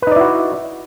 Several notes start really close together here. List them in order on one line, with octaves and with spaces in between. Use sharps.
B4 D#4 D5 E4 F#4